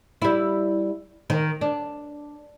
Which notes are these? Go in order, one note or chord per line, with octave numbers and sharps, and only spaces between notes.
G3 E4
D#3
D4